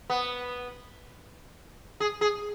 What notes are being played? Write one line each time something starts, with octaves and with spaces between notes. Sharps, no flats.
B3
G#4
G#4